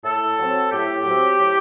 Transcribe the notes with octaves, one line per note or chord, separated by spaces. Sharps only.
A2 A4
F#3 C4
A2 G4
F#3 C4
A2